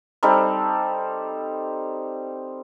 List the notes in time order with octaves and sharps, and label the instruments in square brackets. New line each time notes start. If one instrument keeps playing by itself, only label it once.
[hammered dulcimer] G3 C4 D#4 A4